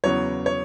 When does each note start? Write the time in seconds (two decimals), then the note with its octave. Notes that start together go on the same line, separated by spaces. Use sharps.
0.04 E2 C#3 F#3 B3 C#5
0.46 C#5